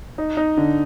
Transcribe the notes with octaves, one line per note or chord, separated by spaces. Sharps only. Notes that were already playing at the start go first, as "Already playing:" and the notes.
D#4
D#4
D3